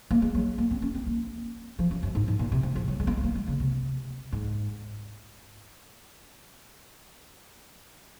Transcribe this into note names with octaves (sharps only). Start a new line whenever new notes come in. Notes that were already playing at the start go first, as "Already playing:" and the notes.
A#3
G#3
F#3
A#3
C4
C#4
C4
A#3
F3
F#2
F#2
G#2
G#2
A#2
C3
F3
F3
F#3
G#3
A#3
G#3
A#3
G#3
C#3
C3
G#2